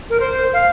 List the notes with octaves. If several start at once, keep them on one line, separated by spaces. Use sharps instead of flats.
A#4
C5
F5